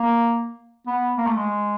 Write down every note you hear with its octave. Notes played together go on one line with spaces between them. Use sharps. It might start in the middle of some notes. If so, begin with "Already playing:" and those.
Already playing: A#3
B3
A#3
A3
G#3